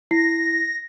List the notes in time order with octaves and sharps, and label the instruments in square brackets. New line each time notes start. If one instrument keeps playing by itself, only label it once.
[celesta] E4 C7 [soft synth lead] A#6